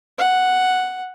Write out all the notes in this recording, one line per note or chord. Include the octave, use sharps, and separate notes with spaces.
F#5